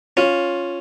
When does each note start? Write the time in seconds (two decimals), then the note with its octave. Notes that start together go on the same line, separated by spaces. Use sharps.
0.17 C#4 F4